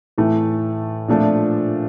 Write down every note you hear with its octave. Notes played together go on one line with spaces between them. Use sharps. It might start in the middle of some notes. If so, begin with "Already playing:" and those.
A2 E3 A3
A#2 F3 A3 D4